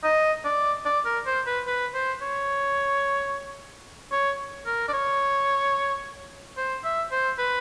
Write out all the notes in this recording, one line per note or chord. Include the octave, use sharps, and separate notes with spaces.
D#5
D5
D5
A#4
C5
B4
B4
C5
C#5
C#5
A#4
D5
C#5
C5
E5
C5
B4